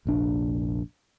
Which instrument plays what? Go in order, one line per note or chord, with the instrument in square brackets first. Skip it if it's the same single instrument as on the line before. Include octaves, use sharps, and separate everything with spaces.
[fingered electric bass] F1 A#1 D4